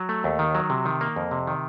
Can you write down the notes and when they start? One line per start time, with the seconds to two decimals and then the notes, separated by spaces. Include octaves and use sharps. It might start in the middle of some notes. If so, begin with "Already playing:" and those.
Already playing: F#3
0.09 A3
0.24 D#2
0.39 D#3
0.55 F#3
0.70 C3
0.85 D#3
1.01 A#3
1.16 F2
1.31 C3
1.47 D#3